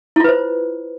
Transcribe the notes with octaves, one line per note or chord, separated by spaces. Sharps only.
E4 F4 B4 C5